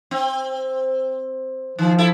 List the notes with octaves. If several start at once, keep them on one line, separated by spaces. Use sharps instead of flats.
C4
D#3 F3
E4 A4